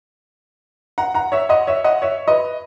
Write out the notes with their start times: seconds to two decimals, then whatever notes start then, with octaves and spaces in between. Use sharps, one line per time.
0.98 F#5 A#5
1.14 F#5 A#5
1.32 C#5 E5
1.49 D#5 F#5
1.67 C#5 E5
1.84 D#5 F#5
2.02 C#5 E5
2.28 B4 D#5